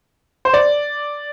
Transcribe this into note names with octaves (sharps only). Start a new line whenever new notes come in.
C5
D5